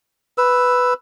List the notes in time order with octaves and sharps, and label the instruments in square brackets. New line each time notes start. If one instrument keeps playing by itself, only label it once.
[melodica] B4 E6